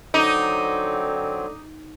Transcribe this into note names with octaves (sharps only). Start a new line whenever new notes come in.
D3 F#3 C4 D#4 D6